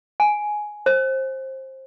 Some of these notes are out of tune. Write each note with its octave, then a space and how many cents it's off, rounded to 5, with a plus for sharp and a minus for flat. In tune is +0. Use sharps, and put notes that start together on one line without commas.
G#5 +10
C5 +20